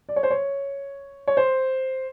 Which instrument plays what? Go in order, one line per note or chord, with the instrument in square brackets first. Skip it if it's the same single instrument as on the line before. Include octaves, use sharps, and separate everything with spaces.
[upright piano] D5
C#5
C5
C#5
C#5
C5